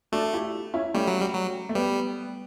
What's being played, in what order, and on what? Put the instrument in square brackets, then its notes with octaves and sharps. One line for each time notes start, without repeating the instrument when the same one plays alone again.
[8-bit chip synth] A3 [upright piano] D4 F#4
[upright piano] E4 G4
C#4 E4
[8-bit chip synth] G3 [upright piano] A3 C#4
[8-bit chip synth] F#3
G3
F#3
[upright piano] A3
[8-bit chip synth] G3 [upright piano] B3